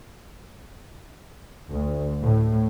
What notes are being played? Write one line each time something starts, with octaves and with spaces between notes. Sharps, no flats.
D2
A2